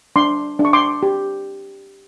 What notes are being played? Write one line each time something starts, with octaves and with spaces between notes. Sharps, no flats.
D4 C6 D6
D4
C#6
C6 D6
G4